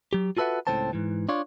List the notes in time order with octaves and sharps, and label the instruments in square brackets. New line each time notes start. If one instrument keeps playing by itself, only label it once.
[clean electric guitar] F#3 G4
F4 F#4 A4 B4 E5 F#5
C#2 A2 F#3 C4 C5 A5
G#2 E3
D4 F4 C#5